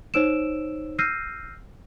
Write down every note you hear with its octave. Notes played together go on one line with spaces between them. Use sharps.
D#4 C5 C#5 E6 D7 E7
E6 F6 G6 A#6 C7 D#7